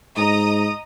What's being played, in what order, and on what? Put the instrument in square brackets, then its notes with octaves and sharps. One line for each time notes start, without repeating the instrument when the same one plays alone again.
[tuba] G#2 [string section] D#5 A#5 D#6